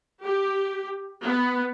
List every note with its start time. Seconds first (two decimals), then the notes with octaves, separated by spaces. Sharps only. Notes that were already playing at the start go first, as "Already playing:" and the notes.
0.24 G4
1.24 B3